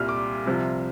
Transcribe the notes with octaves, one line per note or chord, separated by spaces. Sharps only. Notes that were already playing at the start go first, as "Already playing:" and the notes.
Already playing: C2 A#2 G3 F6
D6
C2 C3 F3